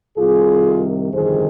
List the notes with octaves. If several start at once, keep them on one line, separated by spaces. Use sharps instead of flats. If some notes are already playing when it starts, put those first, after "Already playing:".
C2 C3 D#3 F4 G#4
G1 F2 C3 D#3 G#4 C5